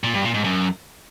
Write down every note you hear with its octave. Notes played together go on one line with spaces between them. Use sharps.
A#2
G2
A#2
G#2
F#2